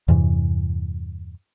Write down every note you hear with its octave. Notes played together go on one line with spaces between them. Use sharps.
E2 G2 C3 E3